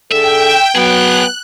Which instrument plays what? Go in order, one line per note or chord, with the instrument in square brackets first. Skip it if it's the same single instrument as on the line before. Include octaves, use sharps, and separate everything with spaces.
[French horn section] D3 G#4 A4 [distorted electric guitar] E5 [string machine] G5
[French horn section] F#3 [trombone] B3 [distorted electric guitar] G#4 G5 [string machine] F#6